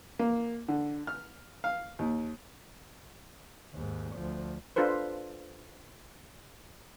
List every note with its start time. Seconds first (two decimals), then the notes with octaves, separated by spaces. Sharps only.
0.19 A#3
0.68 D3
1.07 F6
1.64 F5
1.99 D#2
3.74 D#2 G#2
4.16 D2 F3
4.76 D4 F4 A4 B4 C5